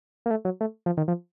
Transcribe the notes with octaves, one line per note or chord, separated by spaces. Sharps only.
A#3
A3
F#3
A3
F3
D#3
F3